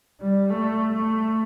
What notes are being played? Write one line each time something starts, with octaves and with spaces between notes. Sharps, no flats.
G3
A3
A3